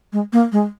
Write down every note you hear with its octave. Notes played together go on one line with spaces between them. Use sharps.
G#3
A#3
G#3